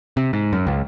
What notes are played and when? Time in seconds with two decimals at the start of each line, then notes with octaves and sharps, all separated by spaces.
0.17 C3
0.33 G#2
0.53 F#2
0.67 C#2